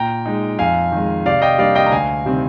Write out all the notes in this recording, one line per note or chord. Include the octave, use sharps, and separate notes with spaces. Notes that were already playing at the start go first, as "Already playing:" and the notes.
Already playing: A#2 G5 A#5
G#3 D#4
F2 F5 G#5
D#3 G#3
C3 D5 F5
D#5 G5
G3 A#3 D4 D5 F5
D#5 G5
A#5
D2 F5 G#5
C3 D#3 G3 C4